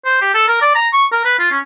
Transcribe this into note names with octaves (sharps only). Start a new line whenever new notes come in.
C5
G4
A4
A#4
D5
A#5
C#6
A#4
B4
F4
C#4